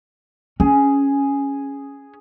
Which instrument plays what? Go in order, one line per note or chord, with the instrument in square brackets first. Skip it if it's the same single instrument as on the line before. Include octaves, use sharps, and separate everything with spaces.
[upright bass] C#4 [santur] G#4